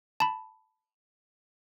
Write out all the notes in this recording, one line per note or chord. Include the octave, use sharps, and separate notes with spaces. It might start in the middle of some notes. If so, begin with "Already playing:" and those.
A5 B5